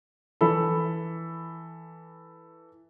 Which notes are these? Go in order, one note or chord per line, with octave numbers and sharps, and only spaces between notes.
E3 A4 B5